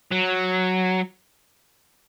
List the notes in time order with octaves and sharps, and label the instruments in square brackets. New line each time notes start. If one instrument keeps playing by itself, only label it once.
[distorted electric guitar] F#3